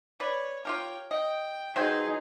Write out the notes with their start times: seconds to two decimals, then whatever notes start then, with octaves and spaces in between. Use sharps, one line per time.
0.20 B4 C#5 D5
0.65 F4 G4 A#4 C#5 G5
1.11 D#5 G5
1.76 F#3 D#4 G#4 B4 C5 G5 C6